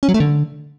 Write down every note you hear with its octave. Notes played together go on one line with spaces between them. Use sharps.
C#4
F#3
A3
D3